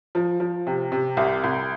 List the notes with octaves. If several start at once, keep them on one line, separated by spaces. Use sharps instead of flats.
F3
F3
C3
C3
C2
C2